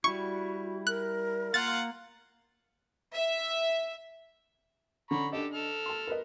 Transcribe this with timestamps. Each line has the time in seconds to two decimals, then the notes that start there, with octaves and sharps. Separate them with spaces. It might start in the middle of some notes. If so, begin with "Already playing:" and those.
0.04 G3 E4 F#4 C#6
0.87 A#4 F#6
1.54 A#3 F4 F5 F#5 A6
3.16 E5
5.11 D3 C#4 A#5 B5 C#6
5.33 D4 G4 A4 D#5
5.54 A4 F6
5.86 A5 C6
6.07 A#4 B4 D#5